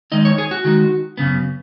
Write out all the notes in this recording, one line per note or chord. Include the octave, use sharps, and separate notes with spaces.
D#3 G#3 D#4 D#5
C#5
G#4
F#4
D#3 G#3 D#4
F#2 C#3 B3